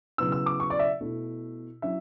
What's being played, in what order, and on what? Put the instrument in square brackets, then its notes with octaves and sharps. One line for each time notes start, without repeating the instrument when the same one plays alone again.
[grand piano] C#3 F#3 B3 E4 E6
E6
D6
C#6
D5
E5
B2 A3 E4
F#3 C#4 E4 E5